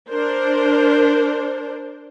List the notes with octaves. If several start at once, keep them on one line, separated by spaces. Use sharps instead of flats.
D4 A#4 C5